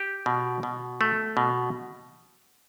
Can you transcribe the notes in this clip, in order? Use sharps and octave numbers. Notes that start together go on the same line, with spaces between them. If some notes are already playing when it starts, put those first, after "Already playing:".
Already playing: G4
B2
B2
A3
B2